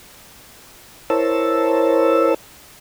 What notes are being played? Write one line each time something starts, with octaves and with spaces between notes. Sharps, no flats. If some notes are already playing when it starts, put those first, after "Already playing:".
E4 A#4 C5 C#5 A5 E6